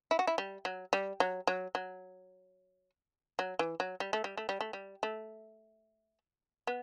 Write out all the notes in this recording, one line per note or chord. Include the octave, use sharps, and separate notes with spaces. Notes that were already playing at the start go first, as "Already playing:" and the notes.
E4
F#4
E4
G3
F#3
G3
F#3
F#3
F#3
F#3
E3
F#3
G3
A3
G3
A3
G3
A3
G3
A3
B3